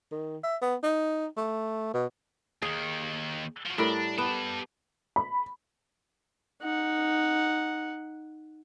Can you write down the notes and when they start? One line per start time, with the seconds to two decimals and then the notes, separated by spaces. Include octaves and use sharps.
0.12 D#3
0.44 E5
0.62 B3
0.83 D#4
1.37 A3
1.94 B2
2.62 D#2 D#3 G#4
3.66 F3 F#4
3.78 A2 G3 D4 A#4
4.18 B3 G4 A5
5.16 B5
6.63 D#4 F#5